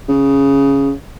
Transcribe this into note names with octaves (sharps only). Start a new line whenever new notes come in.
C#3